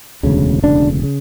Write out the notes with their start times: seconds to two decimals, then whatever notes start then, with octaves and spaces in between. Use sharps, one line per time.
0.23 E1 D2 C#3
0.62 E1 D2 C#3 D4
1.03 C#3